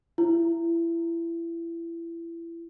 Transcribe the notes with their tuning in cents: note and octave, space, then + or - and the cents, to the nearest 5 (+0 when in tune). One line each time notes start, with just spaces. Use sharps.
E4 +25